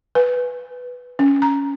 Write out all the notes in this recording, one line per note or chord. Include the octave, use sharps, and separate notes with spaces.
B4
C#4
A#5